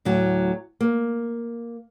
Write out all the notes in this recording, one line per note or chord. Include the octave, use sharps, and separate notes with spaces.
D2 A2 F#3
A#3